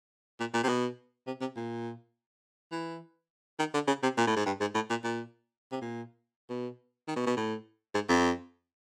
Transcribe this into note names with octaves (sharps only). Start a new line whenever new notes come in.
A#2
A#2
C3
B2
C3
C3
A#2
E3
D#3
D3
C#3
C3
A#2
A2
G#2
G2
G#2
A2
A#2
A#2
C3
A#2
B2
D#3
B2
B2
A2
G#2
F2